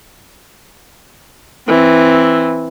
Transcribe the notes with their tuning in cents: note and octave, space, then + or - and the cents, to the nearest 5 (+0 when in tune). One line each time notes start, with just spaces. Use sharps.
E3 +0 C4 +0